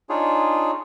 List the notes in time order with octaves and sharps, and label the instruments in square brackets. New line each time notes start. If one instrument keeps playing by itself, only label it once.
[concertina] D4 D#4 F4 G#4 C#5